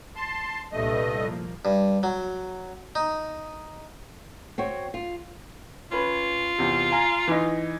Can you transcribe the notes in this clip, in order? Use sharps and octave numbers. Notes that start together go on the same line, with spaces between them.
A5 C6
C2 G2 A#2 A3 D#5
F3 A#3
G2
F#3
D#4
C4 F#4 C#5
F4
C#4 F4 B4
E2 C3
F5 G#5 A#5
E3 D#4